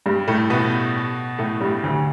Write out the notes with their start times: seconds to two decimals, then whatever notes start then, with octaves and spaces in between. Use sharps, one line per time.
0.06 G2 G3
0.28 A2 A3
0.50 B2 B3
1.39 A2 A3
1.61 G2 G3
1.83 D2 D3